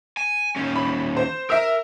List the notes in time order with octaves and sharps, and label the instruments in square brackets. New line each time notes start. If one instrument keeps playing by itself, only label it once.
[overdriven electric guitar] G#5
D#2 C#4
[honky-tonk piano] B5
C5
[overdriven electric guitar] A#4 [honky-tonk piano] E5 E6